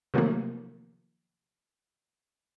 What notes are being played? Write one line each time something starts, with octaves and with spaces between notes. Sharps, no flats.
C3 D#3 F3 F#3 A3 A#3